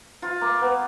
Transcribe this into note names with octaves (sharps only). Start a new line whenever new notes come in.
F4
A#3
B3